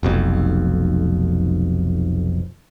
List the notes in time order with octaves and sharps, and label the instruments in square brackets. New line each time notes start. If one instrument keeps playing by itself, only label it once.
[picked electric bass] F1 B1 F2